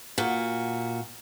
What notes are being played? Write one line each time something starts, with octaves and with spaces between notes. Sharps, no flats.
A#2 F#4